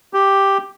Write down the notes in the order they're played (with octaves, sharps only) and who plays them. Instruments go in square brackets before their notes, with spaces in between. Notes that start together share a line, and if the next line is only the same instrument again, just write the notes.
[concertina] G4